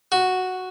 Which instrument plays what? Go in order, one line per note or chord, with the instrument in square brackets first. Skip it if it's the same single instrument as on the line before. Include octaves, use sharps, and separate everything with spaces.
[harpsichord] F#4